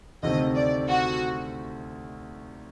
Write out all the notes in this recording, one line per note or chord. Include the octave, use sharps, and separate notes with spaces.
D2 C3 D#3 A3 C4 D#5
D5
F#4